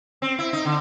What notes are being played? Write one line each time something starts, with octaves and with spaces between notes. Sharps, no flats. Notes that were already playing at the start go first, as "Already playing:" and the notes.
C4
E4
D#4
D3